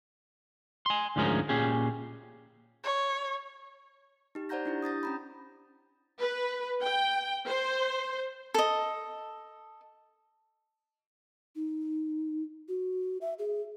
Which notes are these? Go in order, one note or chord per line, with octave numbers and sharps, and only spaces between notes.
G#5 C6
D2 G#2 F3 C#4 G#4 A#4
A#2 C#4 G4 G#4
C#5
D#4 G4
C5 D5 F#5 A#5 G6 A#6
D4 E4 G4
D#6 G6 A6 A#6
C#4 A#5 B5
B4
G5
C5
A4 D#5
D#4
F#4
E5
G#4